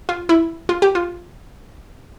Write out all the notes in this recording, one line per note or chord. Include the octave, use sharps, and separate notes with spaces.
F4
E4
F4
G4
F4